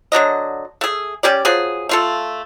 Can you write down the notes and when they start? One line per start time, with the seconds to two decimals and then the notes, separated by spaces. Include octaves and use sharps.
0.12 D3 F#3 D4 D#5
0.81 A3 G#4
1.23 G3 C#4 G4 D5
1.45 F3 F#3 G#4
1.89 A3 F4 A4